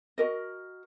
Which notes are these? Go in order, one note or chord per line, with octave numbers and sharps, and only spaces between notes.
F#4 A#4 D#5